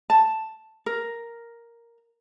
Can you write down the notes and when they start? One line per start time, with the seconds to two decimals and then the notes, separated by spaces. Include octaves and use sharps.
0.10 A5
0.86 A#4